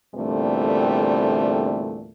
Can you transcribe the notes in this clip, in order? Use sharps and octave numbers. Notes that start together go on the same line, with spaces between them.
E2 A#2 D3 G3 A3 C4